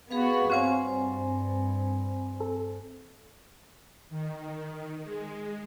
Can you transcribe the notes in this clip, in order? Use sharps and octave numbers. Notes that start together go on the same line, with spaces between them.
B3 F#4 G#4 B4 F5
G2 C4 F#4 C5 C#5 F5 G#5
A4
D#3
G#3